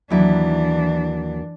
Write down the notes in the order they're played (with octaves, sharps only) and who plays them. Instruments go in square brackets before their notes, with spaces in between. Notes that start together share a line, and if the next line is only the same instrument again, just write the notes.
[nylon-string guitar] D#2 F#3 E4 [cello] E3 D4